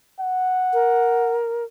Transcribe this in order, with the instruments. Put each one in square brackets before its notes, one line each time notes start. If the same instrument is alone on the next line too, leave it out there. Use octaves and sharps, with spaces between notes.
[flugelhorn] F#5
[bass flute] A#4